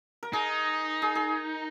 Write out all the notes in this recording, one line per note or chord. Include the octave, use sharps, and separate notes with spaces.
A#4
D#4 G#4
G#4
G#4